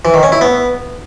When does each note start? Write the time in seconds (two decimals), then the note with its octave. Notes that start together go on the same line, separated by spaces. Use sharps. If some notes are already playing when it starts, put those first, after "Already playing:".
0.05 E3
0.14 D#3
0.23 C#4
0.32 E4
0.41 B3